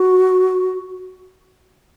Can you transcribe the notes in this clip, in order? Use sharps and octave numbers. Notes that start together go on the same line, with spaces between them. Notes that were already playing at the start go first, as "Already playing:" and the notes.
Already playing: F#4